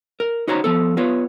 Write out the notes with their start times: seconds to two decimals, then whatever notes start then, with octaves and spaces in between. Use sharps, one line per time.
0.20 A#4
0.48 D#4 F#4 C5 C#5 A#5
0.64 F3 B3 A4
0.97 B3 F4 B4 C#5